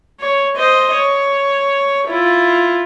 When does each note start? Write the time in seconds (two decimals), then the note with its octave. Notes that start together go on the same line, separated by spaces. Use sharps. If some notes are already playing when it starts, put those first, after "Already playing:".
0.20 C#5
0.56 C5 D#5
0.94 C#5
2.07 E4 F4